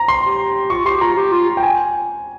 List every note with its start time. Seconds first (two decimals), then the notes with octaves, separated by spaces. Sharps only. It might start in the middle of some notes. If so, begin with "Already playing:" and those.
Already playing: A#5
0.08 C6
0.24 G4
0.70 F4 C#6
0.86 G4 C6
0.97 G4
1.01 F4 A#5
1.17 G4
1.32 F4
1.57 G5
1.63 G#5